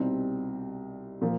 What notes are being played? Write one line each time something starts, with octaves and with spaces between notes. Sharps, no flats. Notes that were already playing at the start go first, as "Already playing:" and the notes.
Already playing: C2 B2 G3 C4 D#4
A#2 F3 A#3